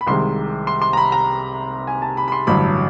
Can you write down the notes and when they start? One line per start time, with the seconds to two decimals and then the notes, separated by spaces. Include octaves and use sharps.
0.01 B5
0.07 C2 C3 D#3 G#3 C6
0.67 C6
0.82 C6
0.93 A#5
0.97 B5
1.12 A#5
1.87 G#5
2.02 A5
2.17 B5
2.28 B5
2.32 C6
2.47 A1 G2 D3 F#3 B5